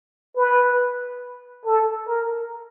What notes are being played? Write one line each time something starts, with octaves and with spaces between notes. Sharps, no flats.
B4
A4
A#4